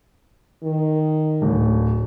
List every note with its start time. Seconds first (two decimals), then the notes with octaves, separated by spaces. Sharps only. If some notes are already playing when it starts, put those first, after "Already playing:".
0.64 D#3
1.42 D1